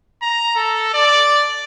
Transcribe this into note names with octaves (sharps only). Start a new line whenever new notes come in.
A#5
A4
D5